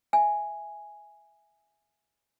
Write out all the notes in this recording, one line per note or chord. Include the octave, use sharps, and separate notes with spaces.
E5 G#5